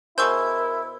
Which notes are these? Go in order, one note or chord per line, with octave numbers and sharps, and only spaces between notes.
B2 E4 G#4 A#4 C5 C#6 E6 G6